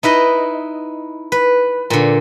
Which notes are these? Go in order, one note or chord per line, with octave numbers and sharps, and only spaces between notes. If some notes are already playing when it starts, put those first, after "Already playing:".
D#4 E4 B4 D#5
B4
A#2 D3